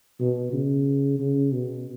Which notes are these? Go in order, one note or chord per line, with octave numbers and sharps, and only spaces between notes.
B2
C#3
C#3
B2